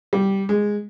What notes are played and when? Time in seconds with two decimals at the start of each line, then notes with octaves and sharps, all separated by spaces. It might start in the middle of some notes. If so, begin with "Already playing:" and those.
0.13 G3
0.49 G#3